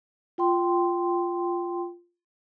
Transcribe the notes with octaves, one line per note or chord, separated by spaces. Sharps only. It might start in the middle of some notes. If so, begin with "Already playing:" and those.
F4 G5 C6